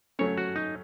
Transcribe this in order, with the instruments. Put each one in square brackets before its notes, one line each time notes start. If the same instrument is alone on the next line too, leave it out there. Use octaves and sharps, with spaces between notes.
[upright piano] F#3 A3 C#4 [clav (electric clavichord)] C#5
[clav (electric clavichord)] F#4
D#4